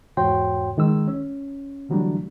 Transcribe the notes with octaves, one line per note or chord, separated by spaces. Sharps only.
E2 G#2 F#4 C#5 G5 C6
C#2 D#3 G#3 E6
C#4
D3 E3 F#3 G3 A3 D4